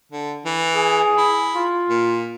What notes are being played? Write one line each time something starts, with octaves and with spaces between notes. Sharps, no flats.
D3
E3
G#4
E4
F4
A#2